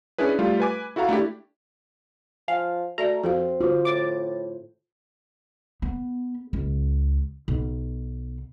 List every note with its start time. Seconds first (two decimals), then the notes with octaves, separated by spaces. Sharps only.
0.18 C#4 D4 E4 G#4 B4
0.39 G3 A3 F4
0.60 B4 G#5 D6
0.96 E4 F#4 A4 F5 A#5
1.09 A3 D4 E4 G4
2.48 F3 F5 G#5
2.98 A3 F#4 D5 E5 A#5
3.24 F2 C4 F#4 A4 F5
3.61 D3 F4 F#4 C5
3.85 A2 D6 A6
5.82 B3
6.53 C#2
7.48 B1